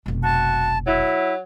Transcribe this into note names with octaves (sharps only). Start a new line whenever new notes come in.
F1 B1
F#4 A5
F#3 E4